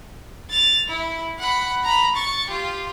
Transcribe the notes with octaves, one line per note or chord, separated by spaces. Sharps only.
A6 F7
E4
F#5 B5
A#5 B5
C#6 A6
F4 G4